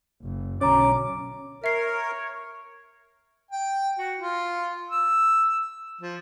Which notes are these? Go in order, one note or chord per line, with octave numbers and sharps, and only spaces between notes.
F#1
B1 D3 F#3 C#4 C#5 A#5 D6
A#4 C#5 E5 C7
G5
F#4
F4
E6
F3